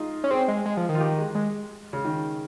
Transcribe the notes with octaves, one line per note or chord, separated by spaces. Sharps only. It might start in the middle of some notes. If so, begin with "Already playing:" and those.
Already playing: D#4 F4 G#4
C#4
C4 G#4
G#3
G#3
F3
D#3
F4
G4
G#3
G#3
C#3
D#3